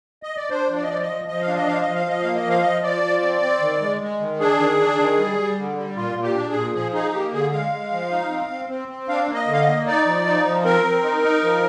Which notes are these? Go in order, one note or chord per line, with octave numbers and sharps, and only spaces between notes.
D#5
D5
D4 C5
F3
D5
D#5
F3 D5
D#5
F3
F3 D#5
F5
D4
D#5
F3 F5
F3 D#5
F5
F3 D#5
A#3 F5
D#5
F3 F5
F3 D#5
F3 D5
F3
C4
C4
D#3
G#3
G#3
D#3
D4 G#4
D#3
D4
D#3
G3
G3
D3
G3
A#2 F4
A#2
G4
D4
G#4
A#2
F3 G#4
D#4 G#4
A#3 G4
D3 G#4
G#3 F5
G#3
F3
D#4
C4
C4
C4
C4
D4 F5
A#3
D#5
D3
F5
D#5
A#3
D#4 D5
F3
D#4
F3
C4 A#4
C4
D#4
D#4
F3